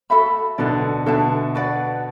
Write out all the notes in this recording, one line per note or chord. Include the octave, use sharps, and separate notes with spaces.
F#4 A4 E5 B5
B2 D3 D4 A4 D5
B2 D3 A4 E5 A5
F#4 B4 D5 F#5